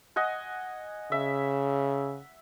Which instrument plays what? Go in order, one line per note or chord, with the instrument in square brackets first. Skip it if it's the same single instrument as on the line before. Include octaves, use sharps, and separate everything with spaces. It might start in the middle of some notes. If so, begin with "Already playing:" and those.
[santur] D#5 F#5 G#5
[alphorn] C#3 [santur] E5